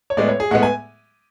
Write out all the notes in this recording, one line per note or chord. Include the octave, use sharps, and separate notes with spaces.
C#5
A2 G#3 B3 D5
C#5
G#4
A2 G#3 B3 F#5
G#5